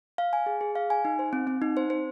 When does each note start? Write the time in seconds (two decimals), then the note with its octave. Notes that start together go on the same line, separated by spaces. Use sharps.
0.18 F5
0.33 G#5
0.46 G#4
0.61 G#4
0.75 F5
0.90 G#5
1.05 D#4
1.19 C5
1.33 C4
1.47 C4
1.62 D#4
1.77 C5
1.90 C5